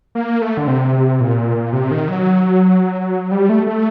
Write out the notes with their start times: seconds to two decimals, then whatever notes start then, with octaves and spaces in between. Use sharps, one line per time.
0.15 A#3
0.42 A3
0.57 D3
0.67 C3
1.21 A#2
1.73 C3
1.91 D#3
2.08 F#3
3.31 G3
3.49 A3
3.67 A3